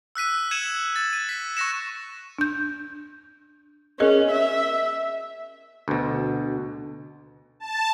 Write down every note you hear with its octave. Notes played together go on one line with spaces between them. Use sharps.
E6 F#6 B6 D#7
G#6 C#7 D#7 E7 F#7
A6
D#7
B6
C#6 F#6 A#6 C#7 E7
D4 G6
C#4 G#4 A#4 D#5
E5
D2 B2
A5